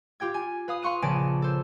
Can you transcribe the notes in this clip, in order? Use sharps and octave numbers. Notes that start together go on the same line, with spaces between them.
F4 G4 G5 G#6
G#5
B4 F5 D#6
F5 C6 C#6 F#6 D#7
A#1 C#3 B4 G#5 A5 D7
A4 C5